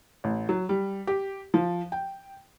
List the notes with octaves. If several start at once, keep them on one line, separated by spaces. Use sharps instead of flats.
A1
F#3
G3
G4
F3
G5